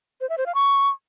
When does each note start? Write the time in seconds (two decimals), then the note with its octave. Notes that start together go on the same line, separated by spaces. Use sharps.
0.21 C5
0.29 E5
0.38 C5
0.46 F5
0.55 C#6